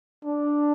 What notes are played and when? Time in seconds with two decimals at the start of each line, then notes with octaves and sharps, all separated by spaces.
0.25 D4